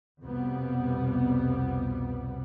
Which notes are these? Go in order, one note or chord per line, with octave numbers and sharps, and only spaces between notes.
C2 F2 B2 G3 B3